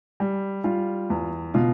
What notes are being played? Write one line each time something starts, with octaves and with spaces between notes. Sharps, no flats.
G3
G3 F4
E2
B2 F4